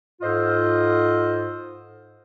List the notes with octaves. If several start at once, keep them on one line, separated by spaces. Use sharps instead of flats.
G#2 F4 A4 C5 D#5